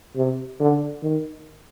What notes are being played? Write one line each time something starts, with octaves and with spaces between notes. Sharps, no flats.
C3
D3
D#3